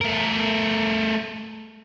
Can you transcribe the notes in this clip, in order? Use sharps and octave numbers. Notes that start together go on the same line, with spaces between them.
A3 A#4